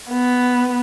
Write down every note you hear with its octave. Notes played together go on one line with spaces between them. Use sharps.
B3